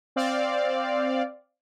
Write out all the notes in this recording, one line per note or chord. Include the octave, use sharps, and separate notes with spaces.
C4 D5 F5